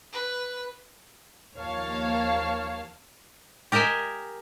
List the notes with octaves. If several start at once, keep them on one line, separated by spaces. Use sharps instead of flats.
B4
D#2 F3 A#3 C#5 F5 A5
G4 A#4 D#5 E5 G#5